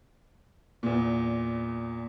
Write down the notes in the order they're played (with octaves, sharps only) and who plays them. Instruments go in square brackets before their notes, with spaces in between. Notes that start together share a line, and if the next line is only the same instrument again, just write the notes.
[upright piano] E2 A#2